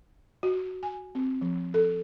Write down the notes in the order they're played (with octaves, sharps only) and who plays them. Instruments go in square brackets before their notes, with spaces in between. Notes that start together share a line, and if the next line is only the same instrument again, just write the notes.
[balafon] F#4
G#5
C4
F3
A4